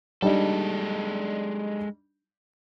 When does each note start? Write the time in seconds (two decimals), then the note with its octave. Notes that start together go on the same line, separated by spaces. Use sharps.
0.22 G3 G#3 D4 D#4 A4